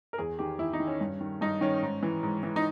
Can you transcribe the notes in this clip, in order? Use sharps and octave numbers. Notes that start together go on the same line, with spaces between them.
A#4
E2 G#4
D#3 G4
E2 E4
D#4
D#3
C#4
G2
D#3
G2 D#4
D#3 C#4
G#2
E3
G#2
E3
D#4